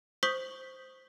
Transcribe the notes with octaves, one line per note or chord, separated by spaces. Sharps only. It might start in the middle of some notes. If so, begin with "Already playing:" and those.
C5 C#6 D#6 G6 B6 F#7